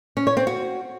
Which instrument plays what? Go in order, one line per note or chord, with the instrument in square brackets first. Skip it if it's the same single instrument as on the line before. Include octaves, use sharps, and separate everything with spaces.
[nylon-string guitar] C#4
C#5
C4
F#4